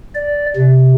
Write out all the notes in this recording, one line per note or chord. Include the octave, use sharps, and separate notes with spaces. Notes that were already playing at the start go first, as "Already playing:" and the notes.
D5
C3